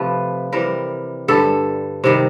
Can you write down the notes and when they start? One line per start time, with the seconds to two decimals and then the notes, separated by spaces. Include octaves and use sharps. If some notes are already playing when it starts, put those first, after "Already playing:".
Already playing: C3 F3 A3 B4
0.53 C3 E3 G3 A#4
1.28 G2 D3 G3 A4
2.04 C3 D#3 G3